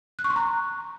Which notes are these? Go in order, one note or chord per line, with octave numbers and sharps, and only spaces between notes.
F#6
C#6
C6
A#5